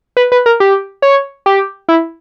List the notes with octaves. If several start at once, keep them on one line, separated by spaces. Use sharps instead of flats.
B4
B4
A#4
G4
C#5
G4
E4